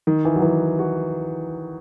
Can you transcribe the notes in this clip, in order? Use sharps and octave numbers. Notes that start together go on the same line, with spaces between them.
D#3
E3
F#3
E3
F#4